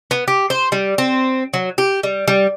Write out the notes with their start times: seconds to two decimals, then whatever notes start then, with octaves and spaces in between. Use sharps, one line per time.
0.11 B3
0.28 G4
0.50 C5
0.72 G3
0.98 C4
1.54 F#3
1.78 G4
2.03 G3
2.28 G3